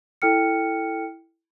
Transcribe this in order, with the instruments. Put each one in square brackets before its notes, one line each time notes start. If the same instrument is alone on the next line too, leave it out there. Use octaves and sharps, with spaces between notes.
[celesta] E4 A4 G5 F6 C#7